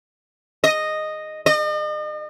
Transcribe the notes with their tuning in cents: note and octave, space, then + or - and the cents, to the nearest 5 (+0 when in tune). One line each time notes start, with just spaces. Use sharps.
D#5 -5
D#5 -40